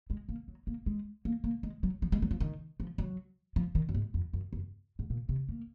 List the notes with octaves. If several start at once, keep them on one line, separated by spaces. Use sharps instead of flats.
G#3
A#3
F#3
A#3
G#3
A#3
A#3
G#3
F#3
F3
G#3
F#3
F3
D#3
F3
F#3
F3
D#3
F#2
G#2
F2
F#2
F#2
G#2
A#2
C3
A#3